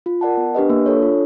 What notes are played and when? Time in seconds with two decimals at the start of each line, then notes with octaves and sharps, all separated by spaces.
0.06 F4
0.21 A#4 D5 F#5 A5
0.37 B3
0.55 D4 G4 B4 D#5
0.70 A#3
0.86 D4 F4 A4 C#5
1.02 F4